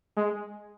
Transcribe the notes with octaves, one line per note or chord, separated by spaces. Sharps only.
G#3